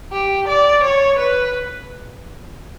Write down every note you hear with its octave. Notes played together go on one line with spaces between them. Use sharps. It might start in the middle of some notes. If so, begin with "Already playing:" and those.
G4
D5
C#5
B4